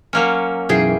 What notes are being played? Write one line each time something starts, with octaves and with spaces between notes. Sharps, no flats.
F#3 A#3 C#4
B1 F#2 E3 G#4 G5 C7